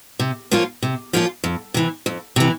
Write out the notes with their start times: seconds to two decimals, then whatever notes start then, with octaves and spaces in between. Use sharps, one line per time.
0.20 C3
0.51 F3 A#3 C#4 F4
0.82 C3
1.13 F3 A#3 C#4 F4
1.44 F2
1.74 C3 E3
2.06 F2
2.36 C3 E3